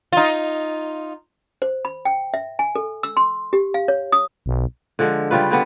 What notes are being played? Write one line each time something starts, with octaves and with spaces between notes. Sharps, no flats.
D#4 F4
C5
B5
G5
E5
G#5
A4
E6
C6
G4
F5
C#5
D#6
B1
D3 F3 G#3
C#3 G3 F4 B4
D3 G3 B3